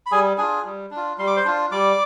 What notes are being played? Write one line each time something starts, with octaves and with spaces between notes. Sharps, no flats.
B5
G3 G#4 G#5
D4 F4 G#4 G#5
G3
D4
F4
G3 C6
D6
C5 C6
D4 F4
G3 D5 D6